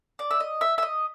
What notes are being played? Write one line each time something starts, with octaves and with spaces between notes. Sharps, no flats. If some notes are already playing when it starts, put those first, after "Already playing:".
D5
E5
D#5
E5
E5
D#5